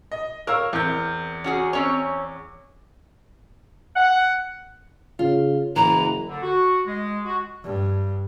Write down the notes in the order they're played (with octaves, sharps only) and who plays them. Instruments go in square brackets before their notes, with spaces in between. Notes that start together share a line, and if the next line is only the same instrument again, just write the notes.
[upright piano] D#5
[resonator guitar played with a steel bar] A#4 C#5 [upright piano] F5 E6 F6
[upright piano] E2 G6 [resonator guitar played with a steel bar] C4 A#4
[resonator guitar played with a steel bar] C#4 F#4 G#4
C4 C#4 C#5
[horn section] F#5
[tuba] C#3 [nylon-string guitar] F4
[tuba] F#1 [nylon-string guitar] E3 [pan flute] A#5
[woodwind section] D3
F#4
G#3
F#4
[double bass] G2